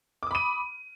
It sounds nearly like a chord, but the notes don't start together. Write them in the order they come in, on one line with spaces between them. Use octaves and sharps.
D6 D#6 B5 D#7